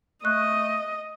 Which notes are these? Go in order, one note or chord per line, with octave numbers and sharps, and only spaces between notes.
A3 D#5 C#6 F#6